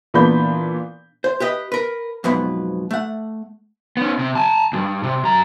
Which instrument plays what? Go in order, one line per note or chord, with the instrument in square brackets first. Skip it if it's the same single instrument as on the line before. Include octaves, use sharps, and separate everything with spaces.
[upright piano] A#2 E3 B3 D4 B5 G6
[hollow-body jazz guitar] C5
G4 B4 D#5
A#4 B4
F2 G#2 B2 F#3 B3
A3 F#5
[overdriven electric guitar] B3 C#4
C3
G#5 A5
D2 G2
C3
F#2 A#5